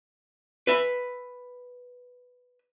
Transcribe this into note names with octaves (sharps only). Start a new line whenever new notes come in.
B4 E5